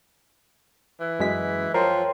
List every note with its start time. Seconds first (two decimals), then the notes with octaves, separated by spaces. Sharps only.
1.00 E3
1.19 F#2 G#3 B6
1.74 F3 A#4 C#5 G5 C6